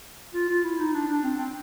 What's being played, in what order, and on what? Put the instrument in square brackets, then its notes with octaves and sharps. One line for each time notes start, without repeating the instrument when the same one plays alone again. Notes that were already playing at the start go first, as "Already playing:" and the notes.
[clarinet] F4
F4
E4
D#4
D4
D4
C4
C4